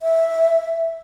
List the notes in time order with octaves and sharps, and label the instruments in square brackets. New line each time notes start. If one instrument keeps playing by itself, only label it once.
[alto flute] E5